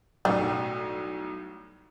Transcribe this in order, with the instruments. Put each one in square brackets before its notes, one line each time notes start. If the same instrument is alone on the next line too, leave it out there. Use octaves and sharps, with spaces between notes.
[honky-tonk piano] B1 A2 [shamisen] G3